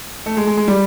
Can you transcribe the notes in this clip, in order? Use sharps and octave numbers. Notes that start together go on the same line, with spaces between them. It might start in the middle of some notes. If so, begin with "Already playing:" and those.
A3
G#3
G#3
G#3
G3